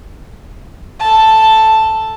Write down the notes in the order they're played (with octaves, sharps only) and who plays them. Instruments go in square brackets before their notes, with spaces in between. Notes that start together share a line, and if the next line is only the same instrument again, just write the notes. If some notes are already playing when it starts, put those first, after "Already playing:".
[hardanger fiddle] A4 A5